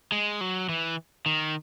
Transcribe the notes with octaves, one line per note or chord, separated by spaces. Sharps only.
G#3
F#3
E3
D#3